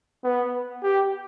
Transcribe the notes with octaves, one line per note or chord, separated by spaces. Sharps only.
B3
G4